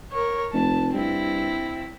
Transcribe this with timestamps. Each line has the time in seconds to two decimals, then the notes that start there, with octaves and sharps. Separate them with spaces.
0.12 A#4 C#5
0.53 F1 A5
0.94 G2 C4 E4